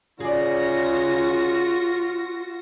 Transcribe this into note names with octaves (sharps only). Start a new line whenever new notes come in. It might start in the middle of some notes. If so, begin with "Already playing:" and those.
C#3 F4 F#4 G#4 D5 A#6